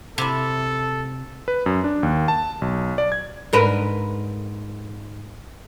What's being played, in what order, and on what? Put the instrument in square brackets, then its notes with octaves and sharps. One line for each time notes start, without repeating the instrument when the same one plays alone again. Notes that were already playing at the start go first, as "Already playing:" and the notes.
[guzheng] C3 E4 [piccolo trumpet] A4
[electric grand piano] B4
F#2
D4
D#2
A5
B1
D5
G#6
[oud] G#2 A#4 B4